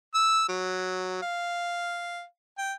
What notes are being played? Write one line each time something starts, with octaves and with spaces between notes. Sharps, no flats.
E6
F#3
F5
G5